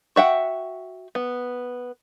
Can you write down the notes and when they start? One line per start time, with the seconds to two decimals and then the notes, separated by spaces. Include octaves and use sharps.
0.16 F#4 E5 F#5 G5
1.15 B3